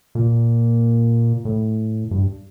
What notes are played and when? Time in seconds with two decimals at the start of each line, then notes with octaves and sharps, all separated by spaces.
0.15 A#2
1.45 A2
2.11 G2